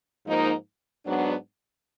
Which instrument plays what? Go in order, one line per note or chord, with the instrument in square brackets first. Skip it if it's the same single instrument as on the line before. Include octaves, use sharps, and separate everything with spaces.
[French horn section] G#2 F3 A#3 D#4
G#2 F#3 B3 D4